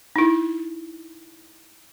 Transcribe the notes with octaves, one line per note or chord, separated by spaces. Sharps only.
D#4 E4